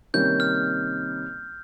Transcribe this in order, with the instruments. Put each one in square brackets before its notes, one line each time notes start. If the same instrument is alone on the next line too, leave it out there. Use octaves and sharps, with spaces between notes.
[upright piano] C3 D#3 G3 A#3 C#4 [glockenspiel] G6
[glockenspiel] F6